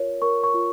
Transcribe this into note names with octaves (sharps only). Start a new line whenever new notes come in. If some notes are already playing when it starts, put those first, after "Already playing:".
Already playing: F4 A#4 C#5
A#4 C#6
C#6
F4